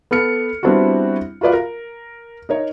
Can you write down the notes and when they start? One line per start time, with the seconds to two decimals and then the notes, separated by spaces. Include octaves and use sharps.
0.11 B3 A4 F6 C#7
0.63 G3 B3 C4 D4 E4 F#4
1.41 F4 F#4 B4 D5 F5
1.53 A#4
2.49 D#4 A#4 C#5